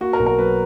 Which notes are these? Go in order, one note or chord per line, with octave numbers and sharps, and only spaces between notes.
A#3 F#4
A#4
B1
A#4
F#3 B4